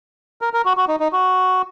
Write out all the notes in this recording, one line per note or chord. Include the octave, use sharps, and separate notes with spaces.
A#4
A#4
F#4
F#4
D#4
D#4
F#4